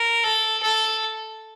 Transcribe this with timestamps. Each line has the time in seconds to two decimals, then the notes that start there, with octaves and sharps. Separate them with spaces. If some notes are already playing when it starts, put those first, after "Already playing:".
Already playing: A#4
0.24 A4
0.63 A4